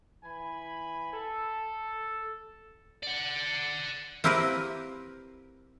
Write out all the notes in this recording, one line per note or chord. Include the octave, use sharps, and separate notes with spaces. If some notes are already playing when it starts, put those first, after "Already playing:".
E3 G#5 B5
A4
D5 F#5
A#3 C4 E4 G4 A#4 B4